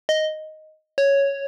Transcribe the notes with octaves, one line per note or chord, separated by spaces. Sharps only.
D#5
C#5